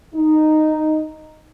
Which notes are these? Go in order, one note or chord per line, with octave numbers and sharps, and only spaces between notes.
D#4